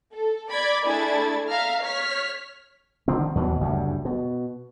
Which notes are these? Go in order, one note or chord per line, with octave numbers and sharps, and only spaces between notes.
A4
D5 B5 D6 G#6
A3 D4 E4 G#4 G#6 A6
E5 F5 A#5 F6
C#5 F6 B6
D3 D#3 F3 C4
D#2 B2 E3 F#3
F#1 D2 G2 G3
B2